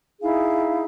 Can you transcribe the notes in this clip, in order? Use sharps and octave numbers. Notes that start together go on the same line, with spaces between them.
D#4 E4 G#4 F5